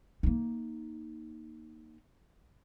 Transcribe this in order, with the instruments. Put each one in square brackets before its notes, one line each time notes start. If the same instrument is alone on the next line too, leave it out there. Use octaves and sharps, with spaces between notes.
[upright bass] A#3 D#4